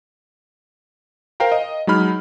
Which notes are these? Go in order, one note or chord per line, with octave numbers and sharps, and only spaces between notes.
A#4 C5 F5 G5 A#5
D#5
F#3 G#3 D#4 B5 F6